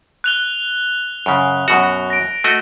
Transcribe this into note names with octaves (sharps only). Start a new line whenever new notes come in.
F#6 F7 G7
F#2 C#3
F#2 B2 F#4
A#6 D7
A3 F#4 D#5